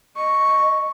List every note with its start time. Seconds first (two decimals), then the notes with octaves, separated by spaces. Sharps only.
0.16 D#5 C#6